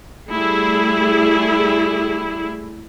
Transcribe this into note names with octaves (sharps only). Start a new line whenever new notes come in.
G3 A3 E4 G#4